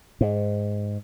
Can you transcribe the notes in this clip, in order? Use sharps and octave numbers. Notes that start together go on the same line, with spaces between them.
G#2